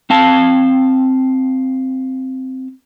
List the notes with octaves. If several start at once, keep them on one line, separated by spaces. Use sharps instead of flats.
C4 F5 A5